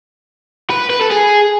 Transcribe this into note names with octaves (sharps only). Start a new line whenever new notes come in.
B4
B4
A4
G#4